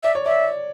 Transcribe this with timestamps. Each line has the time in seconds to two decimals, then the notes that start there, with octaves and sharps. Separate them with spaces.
0.03 D5 E5
0.15 C#5
0.26 D5 E5